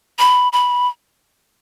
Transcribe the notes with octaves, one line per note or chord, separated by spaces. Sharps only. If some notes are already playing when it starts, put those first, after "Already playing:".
B5
B5